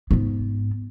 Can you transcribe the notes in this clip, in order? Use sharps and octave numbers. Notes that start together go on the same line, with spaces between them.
G#2 B3